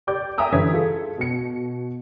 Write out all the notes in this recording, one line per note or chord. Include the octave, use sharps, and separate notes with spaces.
G4 D5 D6 G6
E5 G5 G#5 A#5 D#6 E6
G2 D3 E3 C#5 G#6 B6
F4 G#4 A4
B2 C#7